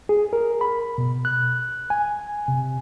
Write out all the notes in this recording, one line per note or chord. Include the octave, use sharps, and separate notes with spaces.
G#4
A#4
B5
B2
F#6
G#5
C3